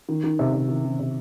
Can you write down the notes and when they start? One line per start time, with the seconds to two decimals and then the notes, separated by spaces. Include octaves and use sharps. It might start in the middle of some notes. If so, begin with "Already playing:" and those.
0.09 D#3
0.24 D#3
0.39 C3
0.54 C3
0.69 D#3
0.84 D#3
0.99 C3